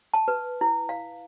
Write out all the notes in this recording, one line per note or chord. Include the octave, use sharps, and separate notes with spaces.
A5
B4
E4
F5